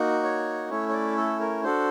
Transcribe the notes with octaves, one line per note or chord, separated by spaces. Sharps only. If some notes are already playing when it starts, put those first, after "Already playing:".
Already playing: A#3 D#4 F#4
C#5
A3 C#4 E4 C#5
C#5
D5
A4
A#4
D4 F#4 A4 C5